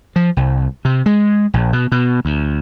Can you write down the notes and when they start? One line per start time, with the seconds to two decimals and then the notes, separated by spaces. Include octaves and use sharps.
0.16 F3
0.37 C2
0.85 C3
1.06 G#3
1.54 A#1
1.73 B2
1.92 B2
2.25 D2